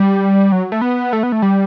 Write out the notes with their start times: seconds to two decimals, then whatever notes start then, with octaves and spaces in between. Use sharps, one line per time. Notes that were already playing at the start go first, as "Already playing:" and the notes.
Already playing: G3
0.52 F#3
0.72 A3
0.81 B3
1.13 A3
1.23 B3
1.32 A3
1.42 G3